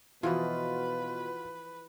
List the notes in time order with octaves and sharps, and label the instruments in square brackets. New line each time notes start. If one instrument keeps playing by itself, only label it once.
[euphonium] B2 [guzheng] E3 F3 D#5 [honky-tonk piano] F4 F#4 [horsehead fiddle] B4